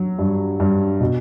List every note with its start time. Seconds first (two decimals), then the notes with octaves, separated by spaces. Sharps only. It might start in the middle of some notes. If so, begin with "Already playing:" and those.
Already playing: F#3
0.19 G2
0.60 G2
1.00 B2